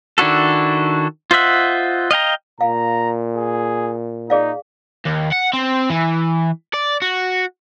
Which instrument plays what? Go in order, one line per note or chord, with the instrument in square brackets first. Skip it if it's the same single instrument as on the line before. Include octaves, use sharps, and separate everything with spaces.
[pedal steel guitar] D#3 D4 E4 F#4 A4
F4 C5 D#5 E5 F#5
D#5 F5 G5 A#5
[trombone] A#2 [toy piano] F5 [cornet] A#5
[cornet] G#4
[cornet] D#4 [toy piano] G#4 D5 F5
[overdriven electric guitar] D#2
F#5
C4
E3
D5
F#4